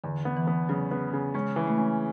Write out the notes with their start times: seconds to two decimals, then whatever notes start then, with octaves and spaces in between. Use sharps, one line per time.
0.04 E2 D3
0.25 B3
0.37 E3
0.47 B3
0.69 C#3 F#3
0.91 B3
1.13 C#3
1.34 G#3 C#4
1.56 E3
1.67 A3
1.78 C#4